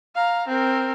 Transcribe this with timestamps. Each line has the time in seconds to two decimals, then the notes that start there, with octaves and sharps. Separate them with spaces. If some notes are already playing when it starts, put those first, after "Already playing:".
0.15 F5 A#5
0.48 C4 A#4